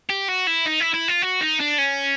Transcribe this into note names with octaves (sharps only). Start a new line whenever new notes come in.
G4
F#4
E4
D#4
E4
E4
F4
F#4
D#4
D4
C#4